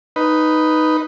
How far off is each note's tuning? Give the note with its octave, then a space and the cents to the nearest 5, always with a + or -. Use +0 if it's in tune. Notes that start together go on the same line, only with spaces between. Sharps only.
D#4 +0 B4 +0